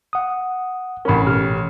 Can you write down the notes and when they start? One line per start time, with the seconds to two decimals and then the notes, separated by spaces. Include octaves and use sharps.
0.13 F#5 D#6
1.05 A1 C#4 A#4 B5
1.27 B2 G4 F6